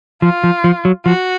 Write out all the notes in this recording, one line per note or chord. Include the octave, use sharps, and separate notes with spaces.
F3 F4
F3
F3
F#3
F3 F#4